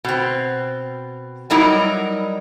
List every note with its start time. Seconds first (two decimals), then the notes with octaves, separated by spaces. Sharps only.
0.05 B2 C4
1.50 F#3 G3 D#4 E4 A#4